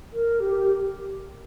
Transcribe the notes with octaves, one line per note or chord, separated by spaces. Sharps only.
A#4
G4